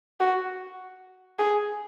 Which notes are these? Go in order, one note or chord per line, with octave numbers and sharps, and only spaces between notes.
F#4
G#4